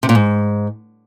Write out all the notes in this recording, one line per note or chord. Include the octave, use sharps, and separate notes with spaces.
C3
A#2
G#2